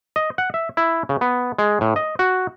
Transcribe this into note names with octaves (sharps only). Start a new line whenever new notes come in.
D#5
F#5
E5
E4
C#3
B3
G#3
A2
D#5
F#4